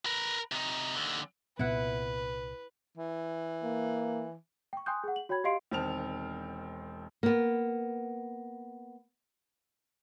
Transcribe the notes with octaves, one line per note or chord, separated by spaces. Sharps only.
A#4 B4
C3 D#4
D#2 D3
C2 A#2 B3 E4 B4 F#5
E3
A#3
G5 C#6
G5 G#5 C6 D#6 F#6 G6
G#4 F#5
F#7
F#4 C#5 G5 B5 G#6
G4 D#5 F5 C6 C7 D7
E1 D#3 C4 A5 F6 F7
A#3 B3